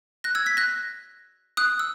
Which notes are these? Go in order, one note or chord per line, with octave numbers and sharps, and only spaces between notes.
F#6 A#6
E6 G#6
G#6 B6
F#6 A#6
D#6 F#6
E6